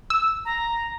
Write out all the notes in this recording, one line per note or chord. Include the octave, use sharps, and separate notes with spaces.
E6
A#5